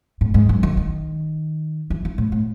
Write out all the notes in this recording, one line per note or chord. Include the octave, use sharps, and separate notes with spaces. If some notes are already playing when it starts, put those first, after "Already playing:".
A2
G#2
F#2
D#3
D#3
E3
E3
A2
A2